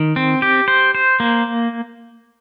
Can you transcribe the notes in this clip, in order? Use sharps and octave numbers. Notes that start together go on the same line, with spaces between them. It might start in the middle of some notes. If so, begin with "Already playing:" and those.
Already playing: D#3
C4
G4
C5
C5
A#3